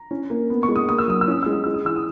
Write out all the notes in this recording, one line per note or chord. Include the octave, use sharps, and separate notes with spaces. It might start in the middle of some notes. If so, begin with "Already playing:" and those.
Already playing: A#5
C#4
A#3
B3
C#6
G#3
D#6
A#3 D#6
E6
F#3 D#6
E6
C#4 D#6
G#3 E6
D#6
G#3 E6
D#6
E3 E6
D#6